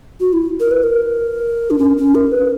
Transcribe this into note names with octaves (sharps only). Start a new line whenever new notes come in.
F#4
E4
A#4
B4
A#4
D4
C#4
C#4
A#4
B4